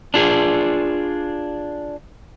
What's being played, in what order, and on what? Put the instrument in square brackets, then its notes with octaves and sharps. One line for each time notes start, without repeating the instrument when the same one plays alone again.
[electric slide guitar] D4 F4 G#4